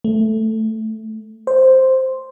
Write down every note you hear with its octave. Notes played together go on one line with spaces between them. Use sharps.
A3
C5